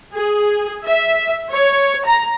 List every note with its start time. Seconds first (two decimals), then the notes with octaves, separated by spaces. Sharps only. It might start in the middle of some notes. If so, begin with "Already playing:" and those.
0.13 G#4
0.85 E5
1.53 C#5
2.06 A#5